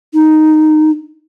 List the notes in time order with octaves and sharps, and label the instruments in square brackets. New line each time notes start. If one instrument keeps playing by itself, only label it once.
[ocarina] D#4